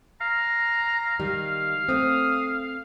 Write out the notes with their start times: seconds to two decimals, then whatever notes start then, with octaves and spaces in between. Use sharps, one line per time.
0.21 F5 A#5
1.20 D#3 G3
1.89 A3 C4 D#6